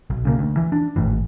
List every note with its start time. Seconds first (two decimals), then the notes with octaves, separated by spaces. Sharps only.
0.10 B1
0.25 C#3 G3 A#3
0.39 D2
0.57 E3
0.72 D4
0.96 G#1 A2 E3